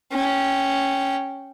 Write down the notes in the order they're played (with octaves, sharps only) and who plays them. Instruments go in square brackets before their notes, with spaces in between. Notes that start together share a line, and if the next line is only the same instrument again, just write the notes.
[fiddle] C#4 G5